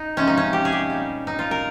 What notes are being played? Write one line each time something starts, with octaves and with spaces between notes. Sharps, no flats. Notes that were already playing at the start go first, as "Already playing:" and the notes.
Already playing: D#4
C3 F3 G#3 C#4
D#4
C#4
G4
G#4
G4
A#2 G3
D#4
F4
A#4